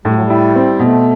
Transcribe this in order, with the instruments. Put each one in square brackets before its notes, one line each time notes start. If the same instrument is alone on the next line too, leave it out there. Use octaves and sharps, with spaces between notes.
[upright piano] A2 [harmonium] G3
[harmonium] F#3
G3
[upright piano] E4
C4
[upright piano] B2 [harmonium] A3